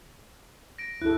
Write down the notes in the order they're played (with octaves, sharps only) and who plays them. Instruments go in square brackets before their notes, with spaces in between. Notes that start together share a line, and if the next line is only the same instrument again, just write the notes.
[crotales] A#6 D7
[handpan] E4 A4 [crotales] F#6